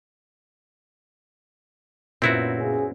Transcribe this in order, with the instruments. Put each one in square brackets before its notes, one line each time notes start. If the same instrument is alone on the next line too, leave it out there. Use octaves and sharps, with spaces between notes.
[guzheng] F#2 B3 A#5 [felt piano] A#2 [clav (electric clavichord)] C4 E4 F#4
[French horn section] C#3 G#4